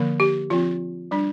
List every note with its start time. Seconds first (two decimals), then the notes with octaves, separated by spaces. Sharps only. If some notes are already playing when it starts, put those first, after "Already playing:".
Already playing: D3 F3 A#3
0.20 G4
0.50 F3 C4 F4
1.11 G3 D4